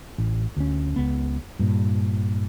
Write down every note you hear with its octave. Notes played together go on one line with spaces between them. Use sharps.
A1
D2 C#4
C#2 B3
G2 A#2